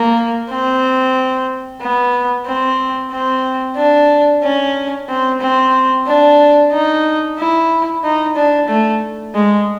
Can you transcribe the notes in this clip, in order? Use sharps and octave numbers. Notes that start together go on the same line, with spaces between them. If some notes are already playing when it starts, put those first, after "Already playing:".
Already playing: A#3
C4
B3
C4
C4
D4
C#4
C4
C4
D4
D#4
E4
D#4
D4
A3
G#3